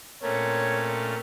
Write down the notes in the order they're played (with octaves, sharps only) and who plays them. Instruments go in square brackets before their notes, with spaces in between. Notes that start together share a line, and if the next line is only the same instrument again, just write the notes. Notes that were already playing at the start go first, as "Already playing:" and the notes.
[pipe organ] A#2 A3 C#4 [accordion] C4 A#4 [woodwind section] C#5